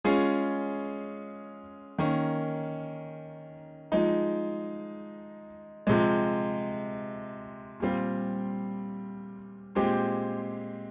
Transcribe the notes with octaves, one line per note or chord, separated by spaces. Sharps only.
G#3 C#4 F4 G#4
D#3 A#3 C#4
F3 G#3 D#4
C3 F3 G#3
A#2 G3 C4 F4
A#2 G#3 C4 G4